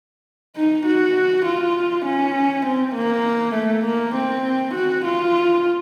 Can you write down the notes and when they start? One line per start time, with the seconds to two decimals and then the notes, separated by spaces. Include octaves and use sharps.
0.56 D#4
0.86 F#4
1.46 F4
2.06 C#4
2.66 C4
2.95 A#3
3.54 A3
3.85 A#3
4.15 C4
4.75 F#4
5.05 F4